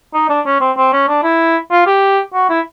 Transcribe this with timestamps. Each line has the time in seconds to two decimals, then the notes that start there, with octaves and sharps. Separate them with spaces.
0.14 D#4
0.30 D4
0.46 C#4
0.60 C4
0.77 C4
0.93 C#4
1.08 D4
1.23 E4
1.71 F4
1.86 G4
2.34 F#4
2.49 E4